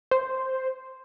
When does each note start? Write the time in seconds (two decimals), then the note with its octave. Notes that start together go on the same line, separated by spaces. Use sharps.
0.11 C5